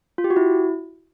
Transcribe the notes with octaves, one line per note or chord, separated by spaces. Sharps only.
F4
G4
F#4
E4